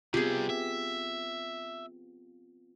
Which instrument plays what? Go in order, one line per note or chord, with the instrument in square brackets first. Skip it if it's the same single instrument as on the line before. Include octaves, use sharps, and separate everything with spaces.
[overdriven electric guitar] C3 G3 [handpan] B3 C4 F4 [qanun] G4 G#4
[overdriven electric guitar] E5